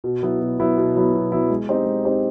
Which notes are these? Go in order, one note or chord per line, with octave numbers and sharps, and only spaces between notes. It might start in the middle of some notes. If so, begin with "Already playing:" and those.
B2
F#3 B3 E4
B2
F#3 B3 E4
B2
F#3 B3 E4
B2
F#3 B3 E4
G#3
C4 D#4 G4 C5
G#3
C4 D#4 G4 C5